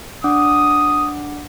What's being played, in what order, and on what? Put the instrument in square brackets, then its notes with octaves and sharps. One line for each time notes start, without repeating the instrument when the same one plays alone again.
[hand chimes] D4 F#5 D6 [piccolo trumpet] D#6